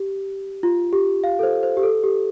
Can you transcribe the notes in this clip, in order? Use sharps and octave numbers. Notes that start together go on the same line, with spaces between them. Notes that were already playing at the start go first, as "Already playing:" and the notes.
Already playing: G4
F4
G4
F5
A4
C5
C5
G4
A4
G4